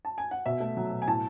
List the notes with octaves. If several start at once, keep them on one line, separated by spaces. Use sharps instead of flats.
A5
G#5
F#5
B2 E5
A3
F#3
B2
G#5
A2 A5